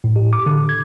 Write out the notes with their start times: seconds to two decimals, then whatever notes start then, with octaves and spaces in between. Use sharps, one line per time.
0.04 A2
0.16 G4
0.33 D6
0.46 D3
0.69 G#6